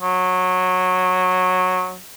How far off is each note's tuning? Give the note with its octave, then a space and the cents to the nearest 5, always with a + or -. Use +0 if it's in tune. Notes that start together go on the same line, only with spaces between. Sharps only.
F#3 -15